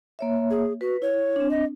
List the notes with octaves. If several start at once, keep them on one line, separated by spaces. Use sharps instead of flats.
A#3 C#5 E5
G#4
F#4 B4
E4 C#5
C4 D4
D#5